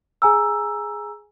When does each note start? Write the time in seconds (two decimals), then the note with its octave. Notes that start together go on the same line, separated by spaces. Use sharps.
0.22 G#4 G#5 A#5 E6